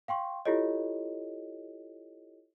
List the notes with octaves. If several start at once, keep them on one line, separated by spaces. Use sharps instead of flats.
F5 G5 C6 C#6
E4 F4 G4 A4 C#5 D#5